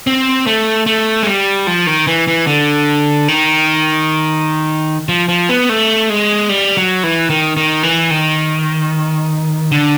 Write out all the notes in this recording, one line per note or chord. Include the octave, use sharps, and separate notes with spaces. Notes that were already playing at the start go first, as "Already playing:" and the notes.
C4
A3
A3
G#3
G3
F3
D#3
E3
E3
D3
D#3
F3
F3
B3
A3
G#3
G3
F#3
E3
D#3
D#3
E3
D#3
D3